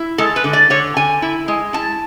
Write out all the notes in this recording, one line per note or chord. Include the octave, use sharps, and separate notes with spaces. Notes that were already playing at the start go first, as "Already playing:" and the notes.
Already playing: E4
G#3 A4
B4
D3
D5
D3 C#5
D3 G#5
E4
G#3
E4 A5